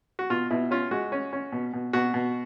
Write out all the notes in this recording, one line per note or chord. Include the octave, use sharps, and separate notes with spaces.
F#4
B2 F4
B2 E4
C#4 F4
G#3 F#4
C#4
C#4
B2
B2
B2 F#4
B2